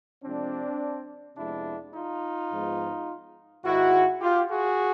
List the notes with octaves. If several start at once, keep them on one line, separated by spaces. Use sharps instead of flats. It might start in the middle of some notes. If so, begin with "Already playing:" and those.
C3 F3 G#3 C4 D4
F2 C3 F3 G#3 B3 D4 E4
D#4 F4
G#2 F3 G#3 B3
G#2 D#3 G#3 E4 F#4
F4 G4
F#4 G#4